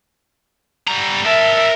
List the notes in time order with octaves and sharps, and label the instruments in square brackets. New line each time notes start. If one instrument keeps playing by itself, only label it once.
[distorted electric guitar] G3 A#5
[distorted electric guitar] A#4 A5 [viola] E5